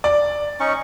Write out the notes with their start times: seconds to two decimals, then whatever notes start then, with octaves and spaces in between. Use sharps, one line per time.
0.04 D5
0.60 C#4 D#4 C#6